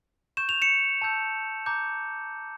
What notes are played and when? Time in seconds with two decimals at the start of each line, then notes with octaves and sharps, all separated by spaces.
0.37 C#6 G6 E7
0.49 F7
0.62 C#7 E7
1.02 A5 E6 G6
1.66 A#5 D6 G6